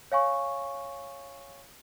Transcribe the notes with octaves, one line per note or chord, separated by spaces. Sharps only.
C#5 F5 G#5 C#6